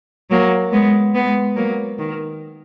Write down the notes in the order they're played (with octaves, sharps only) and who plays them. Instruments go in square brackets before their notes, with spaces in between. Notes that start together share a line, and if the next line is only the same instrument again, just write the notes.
[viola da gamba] F#3 A#3
G#3 B3
G#3 B3
F#3 A#3
D#3